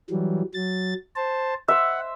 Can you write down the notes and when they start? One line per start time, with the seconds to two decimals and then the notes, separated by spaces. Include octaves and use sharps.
0.10 E3 F#3 G3
0.54 F#3 A6
1.16 C5 A5
1.68 C5 E5 F#5